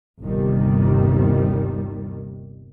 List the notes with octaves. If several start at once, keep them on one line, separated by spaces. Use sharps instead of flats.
G1 D#2 C3 D#3 G3